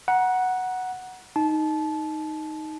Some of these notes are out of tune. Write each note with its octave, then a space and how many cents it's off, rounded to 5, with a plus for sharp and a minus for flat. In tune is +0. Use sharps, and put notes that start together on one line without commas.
F#5 +0 A#5 +35
D#4 +0 A5 -25